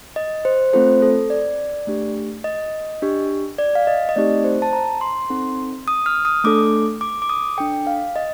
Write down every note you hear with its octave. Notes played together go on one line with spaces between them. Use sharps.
D#5
C5
A3 C4 F4 A4 C5
A4
D5
A3 D4 G4
D#5
D4 G4
D5
F5
D#5
D#5
A3 C4 D#4 G4 D5
C5
A5
A#5
C6
C4 D#4 A4
D#6
F6
D#6
A3 D4 A4 D6
D6
D6
D#6
D4 A4 G5
F5
D#5